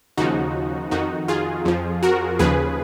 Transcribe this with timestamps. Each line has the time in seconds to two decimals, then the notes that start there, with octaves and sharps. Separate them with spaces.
0.18 D#2 C#3 F3 D#4 F#4
0.91 F2 D#3 D#4 F#4
1.28 F4 G#4
1.65 F2 F3
2.03 F#4 A#4
2.39 D#2 C#3 F3 G#4 B4